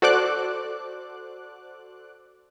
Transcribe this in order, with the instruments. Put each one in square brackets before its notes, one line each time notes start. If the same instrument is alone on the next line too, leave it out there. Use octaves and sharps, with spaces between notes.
[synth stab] F#4 A4 C5 D5 D6 F#6